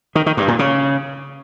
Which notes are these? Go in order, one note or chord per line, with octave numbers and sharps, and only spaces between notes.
D#3
D#3
G2
A#2
C#3